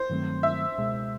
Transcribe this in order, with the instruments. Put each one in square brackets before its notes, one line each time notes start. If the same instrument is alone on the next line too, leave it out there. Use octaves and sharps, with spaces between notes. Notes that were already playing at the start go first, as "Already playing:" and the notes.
Already playing: [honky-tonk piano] C5
[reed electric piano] G2 D#3 F#3 A3 C4
[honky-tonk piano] E5
[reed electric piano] C#2 B2 G#3